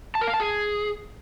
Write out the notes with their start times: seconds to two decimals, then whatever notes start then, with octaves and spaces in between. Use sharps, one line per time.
0.15 A5
0.21 A#4
0.27 F5
0.34 A5
0.40 G#4